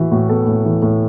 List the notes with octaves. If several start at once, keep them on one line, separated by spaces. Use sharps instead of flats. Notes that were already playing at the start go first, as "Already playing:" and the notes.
Already playing: A2 E3 E4 F#4
A2 F#4
B3 A4
A2
E3
A2